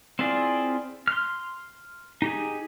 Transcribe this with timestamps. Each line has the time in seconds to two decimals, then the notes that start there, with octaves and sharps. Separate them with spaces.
0.19 C4 E4 F4 G#4 D5
1.08 C6 F6
2.22 D#4 G4 G#4